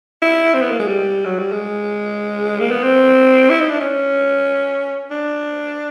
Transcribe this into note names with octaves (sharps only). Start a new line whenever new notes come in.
E4
C4
B3
A#3
G#3
G3
F#3
G3
G#3
A#3
B3
C4
E4
D#4
D4
C#4
D4